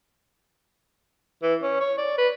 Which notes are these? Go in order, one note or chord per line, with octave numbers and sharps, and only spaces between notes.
E3
C#4
C#5
D5
B4